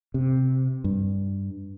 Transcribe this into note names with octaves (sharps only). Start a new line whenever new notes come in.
C3
G2